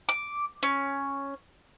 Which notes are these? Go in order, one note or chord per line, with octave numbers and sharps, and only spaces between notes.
D6
C#4